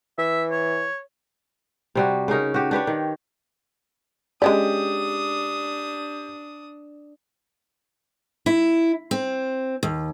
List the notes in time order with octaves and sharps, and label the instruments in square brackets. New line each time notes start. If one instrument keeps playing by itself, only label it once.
[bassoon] E3 [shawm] E5
[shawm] C#5
[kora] C3 G3 F#4
C#3 C#4 D#4 A#4
F#4 G4
D4 G4 B4 C#5
D#3
[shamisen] G#3 C#4 D5 [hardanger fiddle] D4 D#6 [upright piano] G4
[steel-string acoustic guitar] E4
C4
D#2